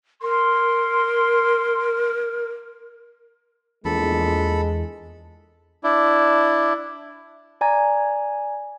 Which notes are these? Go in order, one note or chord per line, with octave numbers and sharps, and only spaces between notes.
A#4 C6
A#1 E2 G#3 A4 B5
D4 E4
D5 G#5 A#5 G#6